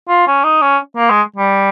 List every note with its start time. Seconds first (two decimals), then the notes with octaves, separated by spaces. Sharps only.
0.09 F4
0.27 C#4
0.44 D#4
0.62 C#4
0.97 A#3
1.10 G#3
1.36 G3